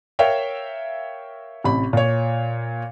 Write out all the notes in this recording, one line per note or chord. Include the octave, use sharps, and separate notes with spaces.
A#4 C#5 E5 F5 G5
A1 C3 B5
A#2 C#5